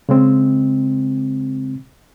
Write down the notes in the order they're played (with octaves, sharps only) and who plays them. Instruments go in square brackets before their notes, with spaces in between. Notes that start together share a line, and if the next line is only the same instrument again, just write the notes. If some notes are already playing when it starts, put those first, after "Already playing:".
[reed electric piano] C#3 G#3 C4